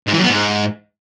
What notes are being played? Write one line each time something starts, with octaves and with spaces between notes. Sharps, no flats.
G#2
E3
F#2
B3
G#2